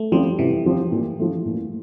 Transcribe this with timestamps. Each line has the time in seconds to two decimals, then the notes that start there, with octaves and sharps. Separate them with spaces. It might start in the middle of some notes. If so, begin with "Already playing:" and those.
Already playing: A3
0.12 F3 G3 C4 G4
0.39 C3 E3
0.66 F3 C4 G4
0.92 A#2
1.20 F3 A3
1.45 A#2